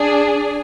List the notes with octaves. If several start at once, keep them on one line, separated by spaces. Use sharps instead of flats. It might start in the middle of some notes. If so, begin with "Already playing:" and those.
Already playing: D4 G#4